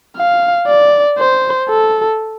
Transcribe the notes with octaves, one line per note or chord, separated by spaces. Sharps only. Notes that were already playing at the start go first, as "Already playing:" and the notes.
F5
D5
C5
A4